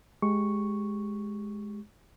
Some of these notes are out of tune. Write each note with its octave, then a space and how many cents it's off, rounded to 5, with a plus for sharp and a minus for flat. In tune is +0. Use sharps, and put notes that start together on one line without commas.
G#3 +10 G4 +0 C#6 +0